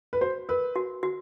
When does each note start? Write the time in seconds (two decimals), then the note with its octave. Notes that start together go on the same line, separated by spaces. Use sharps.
0.13 B4
0.21 F#4 C5
0.49 A#4 B4
0.76 F#4
1.03 F#4